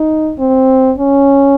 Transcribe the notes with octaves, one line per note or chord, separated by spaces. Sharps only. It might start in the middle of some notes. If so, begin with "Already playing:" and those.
Already playing: D#4
C4
C#4